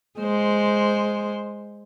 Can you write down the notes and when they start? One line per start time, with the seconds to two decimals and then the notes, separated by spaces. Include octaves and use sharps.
0.19 G#3 C5